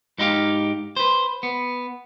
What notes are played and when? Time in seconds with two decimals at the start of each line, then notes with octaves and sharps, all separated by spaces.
0.18 G#2 D#4 E4 G4 F5
0.97 B4 C5
1.43 B3